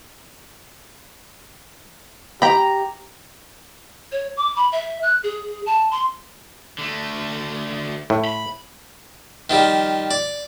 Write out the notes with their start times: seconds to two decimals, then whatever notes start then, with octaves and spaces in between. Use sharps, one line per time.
2.42 G4 G5 A#5 B5
4.12 C#5
4.37 D6
4.56 B5
4.72 E5
5.03 F#6
5.23 G#4
5.66 A5
5.92 C6
6.78 D3 A3
8.10 A2
8.25 B5
9.50 D#3 F3 G3
10.11 D5